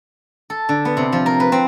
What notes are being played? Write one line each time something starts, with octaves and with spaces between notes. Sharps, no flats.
A4
D3
B3
C3
F3
A#4
B4
C4